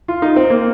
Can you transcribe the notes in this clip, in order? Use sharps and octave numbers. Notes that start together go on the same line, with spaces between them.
F4
D#4
C4
A#3